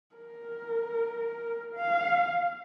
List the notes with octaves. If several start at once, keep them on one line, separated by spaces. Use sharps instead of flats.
A#4
F5